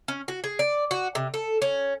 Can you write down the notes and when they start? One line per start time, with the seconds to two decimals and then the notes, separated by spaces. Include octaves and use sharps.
0.08 C#4
0.28 F#4
0.44 G#4
0.59 D5
0.91 F#4
1.15 C3
1.34 A4
1.62 C#4